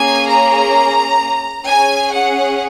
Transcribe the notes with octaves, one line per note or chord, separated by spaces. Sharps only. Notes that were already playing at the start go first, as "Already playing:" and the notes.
Already playing: A#3 C#4 G#4 G#5
A#5
C#4 G#4 G#5
F#5